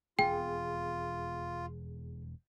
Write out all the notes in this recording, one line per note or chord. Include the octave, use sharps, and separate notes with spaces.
E1 F2 B3 F4 G#4 G5